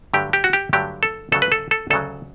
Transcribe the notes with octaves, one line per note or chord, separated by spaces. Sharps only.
G2 D3 F#3 A3 G4
G4
F#4
G4
G2 D3 F#3 A3 G4
A4
D2 C#3 F#3 A4
B4
A4
A4
D2 C#3 F#3 A4